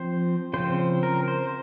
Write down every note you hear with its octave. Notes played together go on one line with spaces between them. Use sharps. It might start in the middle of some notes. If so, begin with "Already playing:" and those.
Already playing: F3 C4 C5
C#3 F3 C4 C5
A#4
C5